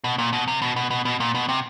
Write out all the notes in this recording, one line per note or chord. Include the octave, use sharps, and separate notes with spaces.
B2
A#2
B2
C3
B2
B2
B2
B2
A#2
B2
C3